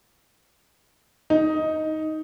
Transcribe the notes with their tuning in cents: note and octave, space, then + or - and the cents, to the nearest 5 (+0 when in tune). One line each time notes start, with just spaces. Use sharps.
D#4 +5